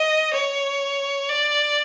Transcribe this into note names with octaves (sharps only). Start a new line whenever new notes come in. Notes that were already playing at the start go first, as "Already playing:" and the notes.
Already playing: D#5
C#5
D5